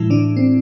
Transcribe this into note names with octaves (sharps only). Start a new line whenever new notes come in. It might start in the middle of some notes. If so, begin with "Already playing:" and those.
Already playing: A2 E3 G#3 E4
D3 D4
C4